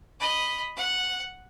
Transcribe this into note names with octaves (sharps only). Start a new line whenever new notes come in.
D#5 B5
F#5